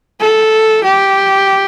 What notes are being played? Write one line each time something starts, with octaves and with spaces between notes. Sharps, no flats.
A4
G4